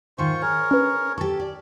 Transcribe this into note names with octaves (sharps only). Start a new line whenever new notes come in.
G#2 D#3 F4 C5 C#6
G#4 A#4 C#5
C#4 B4
G4 A4 C#6 A6
D5